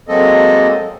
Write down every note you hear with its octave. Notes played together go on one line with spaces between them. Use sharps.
F#3 G#3 A#3 C4 A4 D#5